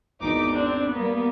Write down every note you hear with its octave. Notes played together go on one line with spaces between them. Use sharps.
G#1 E2 D#4 D6
C4 D4
G3 A#3 B3